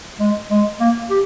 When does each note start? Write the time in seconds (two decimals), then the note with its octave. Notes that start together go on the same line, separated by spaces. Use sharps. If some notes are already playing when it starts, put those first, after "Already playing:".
0.20 G#3
0.51 G#3
0.80 A#3
1.10 G4